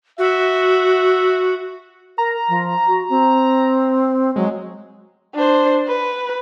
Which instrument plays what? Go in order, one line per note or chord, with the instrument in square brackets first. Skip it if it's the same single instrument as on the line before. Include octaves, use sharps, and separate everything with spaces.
[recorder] F#4 [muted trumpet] E5
[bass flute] A#4 [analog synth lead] A#5
[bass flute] F3
F#4
C4
[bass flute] F#3 [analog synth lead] G#3
[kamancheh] D4 C5
B4